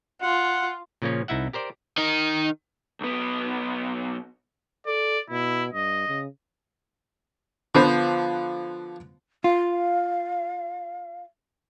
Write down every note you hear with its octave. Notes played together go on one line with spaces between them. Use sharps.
F4 F#5
A#2 C#3 F3 A#3 C#4
C2 D#4 E4 E5 F#5
G4 A#4 C5 D5
D#3 D#4
B1 B3
A4 D5
B2 E4
G2 D#5
C#3
D3 F3 B3 C5
F4 F5